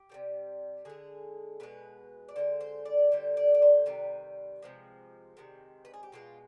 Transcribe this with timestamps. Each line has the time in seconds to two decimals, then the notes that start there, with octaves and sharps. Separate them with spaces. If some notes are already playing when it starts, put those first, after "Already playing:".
Already playing: G4
0.10 C3 D#3 G3
0.85 D3 G#3 G#4
1.60 B2 G#3 B4
2.29 D5
2.36 D3 G#3 C5
2.61 C5
2.85 D5
3.12 D3 G3 C5
3.37 D5
3.55 D5
3.62 C5
3.86 C3 D#3 G3 B4
4.62 C3 F3 G#3
5.37 C3 D#3 G#3
5.85 B4
5.94 G#4
6.03 G4
6.12 B2 G#3 F4